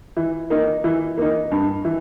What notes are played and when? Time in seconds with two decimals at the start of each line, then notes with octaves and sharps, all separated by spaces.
0.17 E3
0.50 A#3 D#4
0.84 E3
1.18 A#3 D#4
1.51 G2
1.85 E3